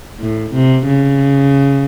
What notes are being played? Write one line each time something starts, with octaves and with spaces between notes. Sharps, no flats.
A2
C3
C#3